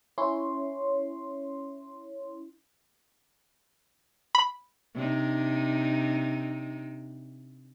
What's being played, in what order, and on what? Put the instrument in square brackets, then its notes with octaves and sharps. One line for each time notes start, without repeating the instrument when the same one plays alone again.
[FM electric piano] C#4 E4 C#5 C6
[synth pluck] B5
[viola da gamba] C3 D4 D#4